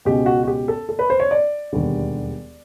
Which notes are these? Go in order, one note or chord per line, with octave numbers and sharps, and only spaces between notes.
C#2 B2 G#3 G4
F#4
F#4
G4
A4
A4
B4
C5
C#5
D5
E1 D#2 D3 G3